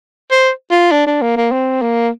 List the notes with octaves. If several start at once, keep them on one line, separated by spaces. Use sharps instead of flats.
C5
F4
D4
D4
A#3
A#3
C4
A#3